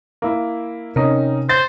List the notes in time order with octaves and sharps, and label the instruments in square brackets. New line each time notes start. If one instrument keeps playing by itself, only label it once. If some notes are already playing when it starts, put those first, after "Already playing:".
[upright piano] A#3 E4
[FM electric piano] C3 [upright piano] C#4 D#4 A#4
[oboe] C5 [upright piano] A6